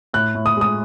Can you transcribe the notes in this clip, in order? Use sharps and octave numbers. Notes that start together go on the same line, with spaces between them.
A2 F#6
A2
D#6
G#3 D#6